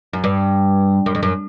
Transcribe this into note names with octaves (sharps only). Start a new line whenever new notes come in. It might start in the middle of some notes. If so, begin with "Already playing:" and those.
F#2
G2
F#2
F2
F#2